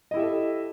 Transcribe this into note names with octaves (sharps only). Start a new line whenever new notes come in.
E4 G4 A4 D#5 E5